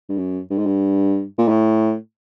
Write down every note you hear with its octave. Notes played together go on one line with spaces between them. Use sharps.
G2
F#2
G2
G#2
G2
A#2
A2